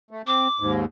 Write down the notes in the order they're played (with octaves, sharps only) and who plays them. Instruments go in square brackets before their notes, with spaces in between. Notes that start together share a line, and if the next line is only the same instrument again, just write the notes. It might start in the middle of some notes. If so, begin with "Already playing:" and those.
[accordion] A3
[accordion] C4 [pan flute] D6
[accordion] D#2 G#2